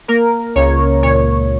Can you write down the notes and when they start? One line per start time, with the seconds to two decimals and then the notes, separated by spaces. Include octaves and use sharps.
0.08 A#3 A#4
0.56 C#2 C#5
1.03 A#2 C#5